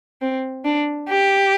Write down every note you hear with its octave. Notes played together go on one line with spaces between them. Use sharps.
C4
D4
G4